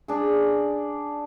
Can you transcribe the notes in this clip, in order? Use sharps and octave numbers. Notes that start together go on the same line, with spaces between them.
D4 G#4